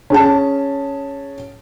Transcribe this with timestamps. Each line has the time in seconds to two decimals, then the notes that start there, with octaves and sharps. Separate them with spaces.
0.10 C#4 G#4 A5